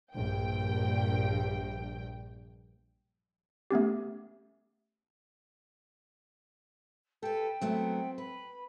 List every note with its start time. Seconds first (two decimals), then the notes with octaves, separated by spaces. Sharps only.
0.14 A#1 G2 G5
3.71 A3 B3 C#4 G4
7.23 G4 A4 B4 G5
7.61 F#3 A3 B3 C4
8.18 B4 B5